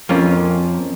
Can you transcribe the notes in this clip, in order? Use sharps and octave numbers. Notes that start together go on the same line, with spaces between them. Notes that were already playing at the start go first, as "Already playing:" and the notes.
F2 A#3 C#4 F4